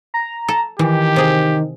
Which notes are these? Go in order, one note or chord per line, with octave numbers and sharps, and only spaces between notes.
A#5
A4
D#3 E3 G4
C3 G#4